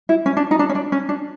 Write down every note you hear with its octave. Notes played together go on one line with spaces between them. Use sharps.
E4
C#4
D4
D#4
D4
C#4
D4
C#4
D4